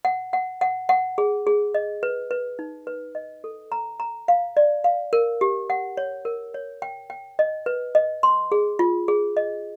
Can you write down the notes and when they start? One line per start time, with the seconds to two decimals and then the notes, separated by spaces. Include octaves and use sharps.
0.05 F#5
0.33 F#5
0.61 F#5
0.89 F#5
1.18 G#4
1.47 G#4
1.74 D#5
2.03 B4
2.31 B4
2.59 D#4
2.87 B4
3.15 D#5
3.44 A4
3.72 A#5
4.00 A#5
4.28 F5
4.57 D5
4.84 F5
5.13 A#4
5.41 G4
5.70 F#5
5.97 C#5
6.25 A#4
6.54 C#5
6.82 G5
7.10 G5
7.39 D#5
7.66 B4
7.95 D#5
8.23 C6
8.52 G#4
8.79 F4
9.08 G#4
9.37 D#5